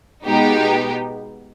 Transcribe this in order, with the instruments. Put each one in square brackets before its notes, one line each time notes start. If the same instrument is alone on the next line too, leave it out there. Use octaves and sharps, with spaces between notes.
[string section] B2 G#3 B3 D#4 G4